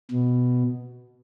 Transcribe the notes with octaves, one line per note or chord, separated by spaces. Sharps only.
B2